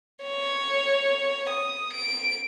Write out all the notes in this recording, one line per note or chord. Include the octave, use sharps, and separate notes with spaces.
C#5
D#6
D7